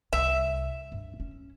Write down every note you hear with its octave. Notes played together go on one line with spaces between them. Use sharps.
C2 E5
G2
C#4